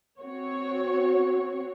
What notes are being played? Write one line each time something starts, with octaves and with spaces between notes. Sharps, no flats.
C4 F#4 C#5